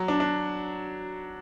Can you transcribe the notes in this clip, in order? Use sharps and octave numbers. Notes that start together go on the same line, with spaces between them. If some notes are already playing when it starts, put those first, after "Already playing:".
Already playing: F#3
D4
D4